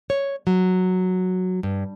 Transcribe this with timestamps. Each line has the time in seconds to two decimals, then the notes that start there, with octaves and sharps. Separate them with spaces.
0.10 C#5
0.47 F#3
1.63 G2